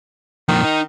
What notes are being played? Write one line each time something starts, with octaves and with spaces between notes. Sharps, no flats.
F2 A#2 D#3
D#4